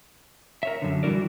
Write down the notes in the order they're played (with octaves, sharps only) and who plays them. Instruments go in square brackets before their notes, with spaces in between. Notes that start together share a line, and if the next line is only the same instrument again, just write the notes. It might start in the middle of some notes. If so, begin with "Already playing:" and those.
[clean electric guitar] A#4 C#5 E5
F#2 D3
E3 G3 E4 F#4 A#4 D5